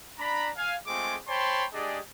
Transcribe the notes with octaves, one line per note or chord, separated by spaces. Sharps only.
D4 A#5 B5
F5 G#5
G#3 A3 C4 F4 G#4 D6
C5 C#5 G5 A5 B5 C6
G#3 D4 G4 G#4 D5 D#5